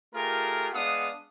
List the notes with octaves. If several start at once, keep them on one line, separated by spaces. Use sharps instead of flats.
A3 F4 G4 G#4 A#4
G#3 B3 D4 F5 F#5 D#6